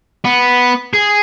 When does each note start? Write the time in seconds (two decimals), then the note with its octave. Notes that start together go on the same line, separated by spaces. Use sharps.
0.25 B3
0.93 G#4